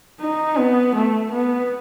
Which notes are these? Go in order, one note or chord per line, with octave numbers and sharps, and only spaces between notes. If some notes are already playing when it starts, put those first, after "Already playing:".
D#4
B3
A3
B3